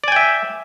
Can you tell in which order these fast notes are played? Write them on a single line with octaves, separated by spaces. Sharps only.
D5 G#5 G5 E5